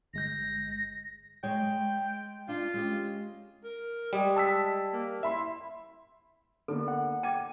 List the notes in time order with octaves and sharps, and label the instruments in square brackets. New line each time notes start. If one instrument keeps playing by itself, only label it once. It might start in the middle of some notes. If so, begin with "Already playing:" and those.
[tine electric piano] G1 G#3 G6 [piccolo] A#6
[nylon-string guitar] G#3 C#5 [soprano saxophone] G5
[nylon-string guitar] G#3
[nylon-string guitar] D4 [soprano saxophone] F4
[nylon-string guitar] G#3 C#4 G4
[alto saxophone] A#4
[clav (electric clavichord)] G3 [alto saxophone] G#3
[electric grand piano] A5 E6 B6
[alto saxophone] A#3
[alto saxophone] E4 [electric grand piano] E5 B5 C6
[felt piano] D3 A#3 B3 [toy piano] A4
[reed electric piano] F#5
[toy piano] G5 [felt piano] D6 G#6 D#7